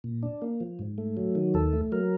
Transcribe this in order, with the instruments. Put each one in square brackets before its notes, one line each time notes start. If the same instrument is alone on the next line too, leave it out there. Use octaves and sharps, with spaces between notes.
[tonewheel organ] A#2
D4
A#3
F3
G#2
A3
F#3
D#3
D#2 A4
A3
F#3 A#4